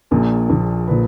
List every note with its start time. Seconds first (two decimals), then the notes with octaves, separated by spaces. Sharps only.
0.11 A#1 A#2 F3 G#4
0.49 A#1 A#2 F3
0.87 A#2 F3 B4